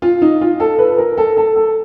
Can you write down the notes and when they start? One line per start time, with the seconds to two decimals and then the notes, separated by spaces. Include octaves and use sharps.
0.02 F4
0.22 D#4
0.41 F4
0.60 A4
0.79 B4
0.98 A#4
1.18 A4
1.37 A4
1.56 A4